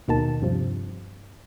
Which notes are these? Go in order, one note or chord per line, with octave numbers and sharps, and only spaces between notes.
D#2 B2 D#3 A5
G2 C3 F3